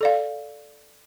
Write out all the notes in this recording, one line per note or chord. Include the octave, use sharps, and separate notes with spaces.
A4 D5 F5